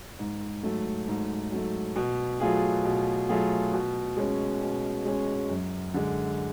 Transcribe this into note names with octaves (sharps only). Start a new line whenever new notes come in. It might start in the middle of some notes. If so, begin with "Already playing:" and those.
G#2
F#3 A3
G#2
F#3 A3
B2
F#3 A3 F4 G#4
B2
F#3 A3 F4 G#4
B2
G#3 C#4
B2
G#3 C#4
F#2
D3 G#3